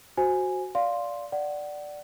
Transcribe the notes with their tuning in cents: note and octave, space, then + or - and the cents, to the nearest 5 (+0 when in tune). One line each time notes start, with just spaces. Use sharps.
F#4 +0 C5 +0 G#5 +0
D5 -15 F5 +5 C6 +0
D5 +0 F#5 +25